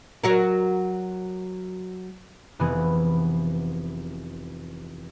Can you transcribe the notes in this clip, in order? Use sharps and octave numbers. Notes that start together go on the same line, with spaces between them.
F#3 F#4 A#4
F1 E3 B3 G#4